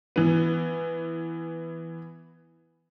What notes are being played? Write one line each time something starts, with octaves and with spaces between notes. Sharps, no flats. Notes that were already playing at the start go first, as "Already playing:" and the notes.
E3 B3